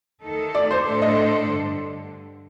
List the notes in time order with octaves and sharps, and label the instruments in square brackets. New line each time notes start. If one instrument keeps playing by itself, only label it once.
[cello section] D#2 D#3 A3 D#4 A4
[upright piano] D5
C5
[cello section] A2 A3 D4 A4 C5
[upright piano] D#5
[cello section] G2 D3